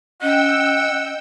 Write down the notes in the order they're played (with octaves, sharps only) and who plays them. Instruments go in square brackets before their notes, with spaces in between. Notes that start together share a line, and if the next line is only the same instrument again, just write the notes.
[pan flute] C#4 [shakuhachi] D#5 [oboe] F#5 [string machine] G5 E6